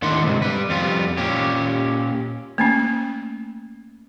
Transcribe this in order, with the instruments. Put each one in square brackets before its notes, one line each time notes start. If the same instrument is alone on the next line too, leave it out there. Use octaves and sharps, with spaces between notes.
[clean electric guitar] D#2 A2 D#3 D4 F#5 C6
D2 G#2 C3
G3 B4
F2 G3 B3 F4
A#2 C#4 G4
[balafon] A3 A#3 C#4